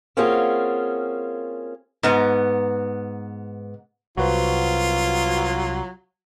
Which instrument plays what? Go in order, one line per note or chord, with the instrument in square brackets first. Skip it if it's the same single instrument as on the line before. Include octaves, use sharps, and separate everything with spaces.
[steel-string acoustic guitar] A#3 C4 C#4 F4 F#4 G#4
[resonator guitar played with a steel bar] G#2 B3
[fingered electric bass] C2 [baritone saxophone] F#3 [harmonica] F4 [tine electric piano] F#4 B4 C5